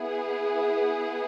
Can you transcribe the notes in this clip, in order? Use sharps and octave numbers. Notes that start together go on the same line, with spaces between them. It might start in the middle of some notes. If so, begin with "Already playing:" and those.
Already playing: B3 E4 G#4